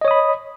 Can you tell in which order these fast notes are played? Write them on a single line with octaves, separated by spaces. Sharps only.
D#5 C#5 D#6 B5